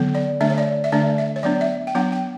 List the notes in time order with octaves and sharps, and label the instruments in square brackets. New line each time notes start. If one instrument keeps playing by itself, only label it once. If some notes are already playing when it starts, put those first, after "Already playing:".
Already playing: [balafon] D3 F#3 B3
D5
D3 A3 D4 E5
C#5
D5
E5
D3 A3 D4 D5
E5
C#5
F#3 B3 D4 D5
E5
G5
F#3 B3 D4 F#5
G5